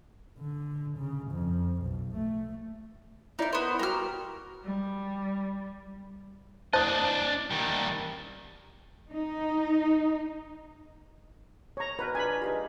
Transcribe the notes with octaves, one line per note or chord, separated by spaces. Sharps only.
D3
C#3
F2
B1
A3
D#4 E4 A#4 D5
B3 C5
F#4 G4 A#4 A#5 F6
G3
D4 C5 D#5 A5 D#6 F#6 A6
D#3 G3
D#4
C#5 A#5
B2 A#4 B4 A#5 B5 F6
F3 D4 G#4 G#5 B5
G#3 D#4 F4 G4 B4